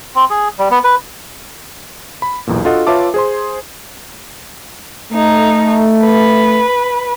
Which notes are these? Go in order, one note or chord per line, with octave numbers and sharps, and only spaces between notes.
C4
G#4
G3
B3
B4
B5
B1 E2 A#2
D4 F4 F#4 A4 D#5 F#5
F4 B4 C#5 E5 A5 D6
G#4 C5 C6
A3 D#4
B4